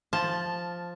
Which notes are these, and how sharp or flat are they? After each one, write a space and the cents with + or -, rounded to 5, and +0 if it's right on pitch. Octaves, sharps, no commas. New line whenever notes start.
F3 +0 A5 +0